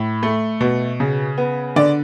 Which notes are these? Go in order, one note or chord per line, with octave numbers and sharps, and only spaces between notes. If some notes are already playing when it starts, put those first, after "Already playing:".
Already playing: A2 B5
A3
B2
C#3
B3
D3 D5